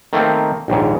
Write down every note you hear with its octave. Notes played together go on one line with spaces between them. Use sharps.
D#3 A3 A#3 C4
A#1 D#2 G#2